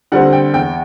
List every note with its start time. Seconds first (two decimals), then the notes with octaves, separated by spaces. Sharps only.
0.12 D3 G3 C4 F#5
0.33 G5
0.54 E2 G5